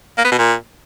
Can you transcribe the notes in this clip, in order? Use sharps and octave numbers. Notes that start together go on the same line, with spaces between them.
A#3
B3
B2
A#2